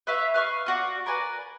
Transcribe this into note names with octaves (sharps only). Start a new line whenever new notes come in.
B4 C#5 E5 F5
B4 F5 C#6 F6
F4 F#4 D5
A#4 B4 D5 G#5